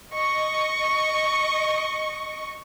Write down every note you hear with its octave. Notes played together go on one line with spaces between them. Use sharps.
D#5 C#6